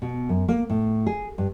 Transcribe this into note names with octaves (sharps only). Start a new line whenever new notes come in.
B2
F#2
A#3
A2
G#4
G2